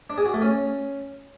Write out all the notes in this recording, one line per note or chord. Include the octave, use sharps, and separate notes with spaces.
D4
G#4
F#4
A3
C#4